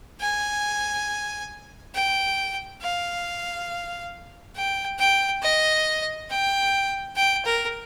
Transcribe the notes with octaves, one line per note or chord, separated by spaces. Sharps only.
G#5
G5
F5
G5
G5
D#5
G5
G5
A#4